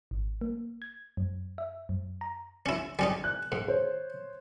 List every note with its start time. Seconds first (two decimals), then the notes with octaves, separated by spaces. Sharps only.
0.11 G#1
0.41 A#3
0.82 G#6
1.17 F#2
1.58 E5
1.89 F#2
2.21 A#5
2.66 C#4 E4
2.99 G3 C#4 D#4 G#5
3.24 F#6
3.52 G#2
3.68 C5 C#5